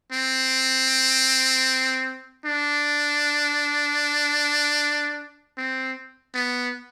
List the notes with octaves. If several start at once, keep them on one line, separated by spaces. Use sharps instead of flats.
C4
D4
C4
B3